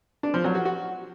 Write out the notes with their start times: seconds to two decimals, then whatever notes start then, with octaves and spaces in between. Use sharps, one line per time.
0.23 D4
0.34 F3
0.44 F#3
0.55 F#4
0.65 F#4